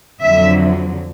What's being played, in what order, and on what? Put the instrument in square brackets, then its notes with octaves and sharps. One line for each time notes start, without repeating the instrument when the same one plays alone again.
[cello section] F2 D3 F#3 E5